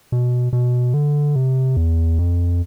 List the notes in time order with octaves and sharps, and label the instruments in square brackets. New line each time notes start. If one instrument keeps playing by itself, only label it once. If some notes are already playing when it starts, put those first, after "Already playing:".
[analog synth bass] B2
B2
D3
C3
E2
F2